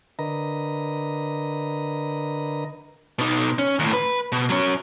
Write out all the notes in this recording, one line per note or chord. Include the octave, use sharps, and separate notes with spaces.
D3 A#4 B4 D#5 A#5
B2 D#4
C#4
D#2 A2
B4
B2
F#3 C#4